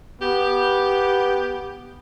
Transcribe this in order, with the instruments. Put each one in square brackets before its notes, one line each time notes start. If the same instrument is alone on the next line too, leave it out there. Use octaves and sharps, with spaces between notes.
[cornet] B3 [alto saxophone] G4